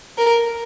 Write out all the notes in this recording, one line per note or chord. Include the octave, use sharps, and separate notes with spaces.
A#4